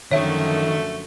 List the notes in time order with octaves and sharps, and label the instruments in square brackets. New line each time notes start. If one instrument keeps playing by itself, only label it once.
[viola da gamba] F#2 D3 F3 [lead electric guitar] D#3 [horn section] F#3 A3 [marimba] C#5 E5